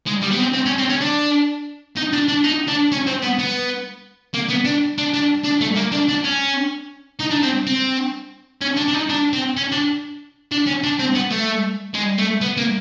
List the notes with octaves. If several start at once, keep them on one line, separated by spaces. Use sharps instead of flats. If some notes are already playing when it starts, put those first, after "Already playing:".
G#3
G3
B3
C4
C4
C#4
C4
C#4
D4
D#4
D4
D4
D#4
D4
C#4
C4
B3
B3
A#3
B3
D4
D4
D4
D4
A3
A#3
D4
D4
C#4
D#4
D4
C4
C4
C#4
D4
D4
D#4
D4
C4
C#4
D4
D4
C#4
D4
C4
B3
A3
G#3
A3
B3
A#3